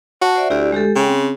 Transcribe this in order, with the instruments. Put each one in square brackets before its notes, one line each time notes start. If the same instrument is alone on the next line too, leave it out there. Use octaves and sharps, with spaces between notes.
[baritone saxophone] F#4 [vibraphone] A5
[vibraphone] C5 D5 E5
[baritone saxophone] D2 [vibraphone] E4 G4 D5
[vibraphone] G#3 G4 A4
[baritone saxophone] C#3 [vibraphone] G5
[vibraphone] C4